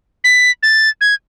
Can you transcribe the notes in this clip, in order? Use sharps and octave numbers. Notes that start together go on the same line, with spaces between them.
B6
A6
G#6